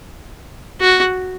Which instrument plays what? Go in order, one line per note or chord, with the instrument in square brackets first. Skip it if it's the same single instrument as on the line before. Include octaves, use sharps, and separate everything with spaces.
[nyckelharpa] F#4